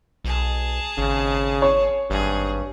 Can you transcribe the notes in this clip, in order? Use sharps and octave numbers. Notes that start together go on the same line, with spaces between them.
B1 G#4 A5
G#1 C#3
C#5
G#1 G2 G#4